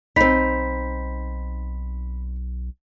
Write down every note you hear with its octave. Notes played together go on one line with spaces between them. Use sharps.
B1 C4 D#4 B5 B6